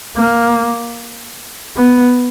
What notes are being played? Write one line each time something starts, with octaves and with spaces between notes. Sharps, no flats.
A#3
B3